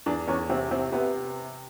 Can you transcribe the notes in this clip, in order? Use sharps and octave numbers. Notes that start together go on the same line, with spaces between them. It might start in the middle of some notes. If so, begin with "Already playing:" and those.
E2 D4
E2 C#4
C3 C4
C3 C4
C3 B3